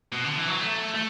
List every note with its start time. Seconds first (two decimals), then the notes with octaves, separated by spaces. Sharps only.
0.12 B2
0.24 D3
0.36 E3
0.48 F#3
0.60 A3
0.94 A3